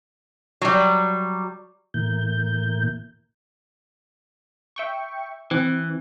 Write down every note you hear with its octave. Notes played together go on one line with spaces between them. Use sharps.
F#3 G3
A2 E3 A#3 G6
E5 G5 C#6
E3 C4